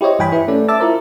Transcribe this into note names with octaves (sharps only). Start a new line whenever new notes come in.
E4 G4 C5 C#5 D#5
G2 E3 G5 G#5 B5
E4 B4
A3 C#4 A4 D5
E5 A5 D6 E6 A6
E4 F4 A#4 C5